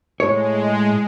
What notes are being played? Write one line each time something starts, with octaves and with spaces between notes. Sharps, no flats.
A2 G#3 C#5